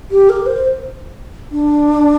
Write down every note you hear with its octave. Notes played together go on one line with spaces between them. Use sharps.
G4
A#4
C5
D4